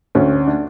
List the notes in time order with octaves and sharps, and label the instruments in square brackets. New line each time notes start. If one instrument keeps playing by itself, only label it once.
[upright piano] D2 C#4
D4